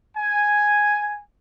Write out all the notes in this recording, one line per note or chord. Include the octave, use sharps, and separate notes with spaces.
G#5